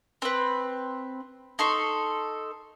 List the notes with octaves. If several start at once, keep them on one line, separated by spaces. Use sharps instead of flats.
C4 B4
D#4 A4 C6 C#6